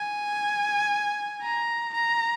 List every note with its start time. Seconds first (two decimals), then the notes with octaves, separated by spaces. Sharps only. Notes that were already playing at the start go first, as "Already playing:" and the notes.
Already playing: G#5
1.42 A#5
1.93 A#5